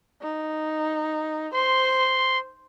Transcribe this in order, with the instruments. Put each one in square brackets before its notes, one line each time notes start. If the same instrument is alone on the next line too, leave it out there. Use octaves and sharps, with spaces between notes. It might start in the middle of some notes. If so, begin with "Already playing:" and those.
[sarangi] D#4
[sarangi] C5 [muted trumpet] C6